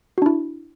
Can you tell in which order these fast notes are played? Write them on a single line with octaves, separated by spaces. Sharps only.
F#4 D4 E4